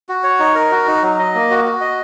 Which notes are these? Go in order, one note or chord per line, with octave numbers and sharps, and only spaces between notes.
F#4
C#5
D#4
A#4
F#4
D#4
F#3
D#5
A#3
F#4
F#4
D#5